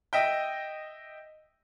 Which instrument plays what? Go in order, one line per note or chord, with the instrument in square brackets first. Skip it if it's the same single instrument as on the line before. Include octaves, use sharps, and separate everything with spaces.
[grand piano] D#5 E5 G5